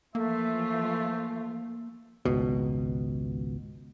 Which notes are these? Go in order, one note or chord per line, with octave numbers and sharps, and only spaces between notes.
E3 F3 A3 A#3 F4 E5
G#1 C#2 B2